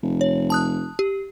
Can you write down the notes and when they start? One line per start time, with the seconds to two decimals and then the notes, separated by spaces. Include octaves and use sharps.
0.03 F1
0.21 C#5
0.50 A5 D#6 F#6
0.99 G4